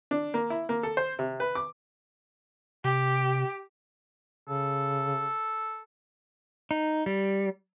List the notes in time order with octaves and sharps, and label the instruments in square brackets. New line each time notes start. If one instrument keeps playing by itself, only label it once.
[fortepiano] D4
A#3
E4
A#3
A4
C5
C3
B4
D6
[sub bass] C3 [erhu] G4
[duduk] C#3 [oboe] A4
[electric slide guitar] D#4
G3